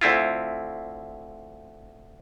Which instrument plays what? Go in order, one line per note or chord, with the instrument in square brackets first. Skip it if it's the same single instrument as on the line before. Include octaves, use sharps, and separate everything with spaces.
[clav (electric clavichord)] D2 C4 E4 F4